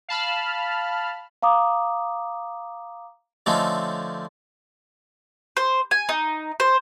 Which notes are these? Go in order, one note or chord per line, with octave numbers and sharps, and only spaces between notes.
F5 A5 B5 F6
F5 A#5 D6 D#6
D3 F3 A3 C4 C#4 D#4
C5
G#5
D#4
C5